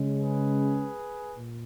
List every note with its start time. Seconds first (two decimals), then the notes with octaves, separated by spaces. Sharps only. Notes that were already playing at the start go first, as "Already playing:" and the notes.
Already playing: C#3 G#3 C#4
0.17 G#4 B4
1.35 A#2